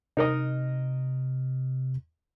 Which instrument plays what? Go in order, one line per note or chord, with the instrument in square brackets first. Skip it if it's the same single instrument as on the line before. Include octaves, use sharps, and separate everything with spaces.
[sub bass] C3 [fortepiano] D#4 A#4 D#5